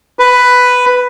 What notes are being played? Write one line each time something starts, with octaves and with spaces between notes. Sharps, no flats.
B4